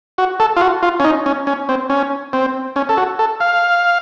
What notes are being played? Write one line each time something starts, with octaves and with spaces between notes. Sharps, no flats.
F#4
A4
F4
F#4
F4
C#4
D#4
C#4
C#4
C4
C#4
C4
C#4
A4
F#4
A4
F5